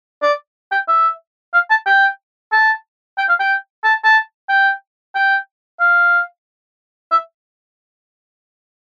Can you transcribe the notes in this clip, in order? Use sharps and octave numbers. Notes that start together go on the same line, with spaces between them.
D5
G5
E5
F5
A5
G5
A5
G5
F5
G5
A5
A5
G5
G5
F5
E5